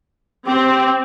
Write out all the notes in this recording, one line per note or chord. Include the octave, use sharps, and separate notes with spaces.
C4 G4